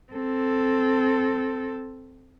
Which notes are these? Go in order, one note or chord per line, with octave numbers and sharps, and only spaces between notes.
C4 A4